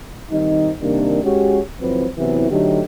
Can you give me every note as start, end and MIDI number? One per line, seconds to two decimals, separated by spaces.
0.31 0.70 51
0.31 0.70 55
0.31 0.70 60
0.31 0.70 63
0.81 1.19 48
0.81 1.19 51
0.81 1.19 55
0.81 1.19 58
0.81 1.19 62
1.23 1.59 56
1.23 1.59 61
1.23 1.59 66
1.23 1.59 67
1.80 2.07 32
1.80 2.07 41
1.80 2.07 54
1.80 2.07 60
1.80 2.07 64
1.80 2.07 71
2.18 2.47 48
2.18 2.47 52
2.18 2.47 54
2.18 2.47 59
2.18 2.47 60
2.18 2.47 64
2.50 2.81 50
2.50 2.81 54
2.50 2.81 57
2.50 2.81 63
2.50 2.81 67